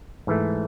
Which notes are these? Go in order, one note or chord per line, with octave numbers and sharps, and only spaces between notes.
G#2 E3 A3